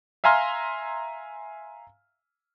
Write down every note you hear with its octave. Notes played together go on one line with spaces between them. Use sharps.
E5 F5 G#5 A#5 C6 F6